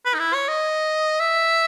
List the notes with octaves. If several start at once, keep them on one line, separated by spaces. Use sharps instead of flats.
B4
D#4
E4
C#5
D#5
E5